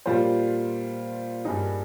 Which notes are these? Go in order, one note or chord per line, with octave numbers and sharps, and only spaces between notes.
A#2 G3 A#3 F4 C5
G2 G3 A#3 D#4 G#4